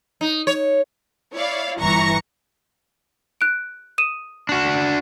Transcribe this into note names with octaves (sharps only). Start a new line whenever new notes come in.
D#4
C#5
E4 C#5 D5 F5
G1 E3 A#5 C#6 A#6
F#6 D7
D#6 D#7 E7
D4 F#4